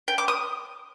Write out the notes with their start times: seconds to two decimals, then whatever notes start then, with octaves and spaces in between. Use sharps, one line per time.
0.08 G5
0.18 D6
0.28 D#6